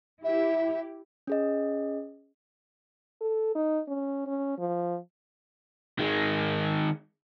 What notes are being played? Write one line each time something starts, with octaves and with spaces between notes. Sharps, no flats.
E4 G4 E5
C#4 G#4 D#5
A4
D#4
C#4
C#4
F3
D#3 G#3